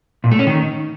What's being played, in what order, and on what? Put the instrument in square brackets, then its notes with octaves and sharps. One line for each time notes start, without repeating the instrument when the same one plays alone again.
[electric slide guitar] A#2
A3
C#4
D#3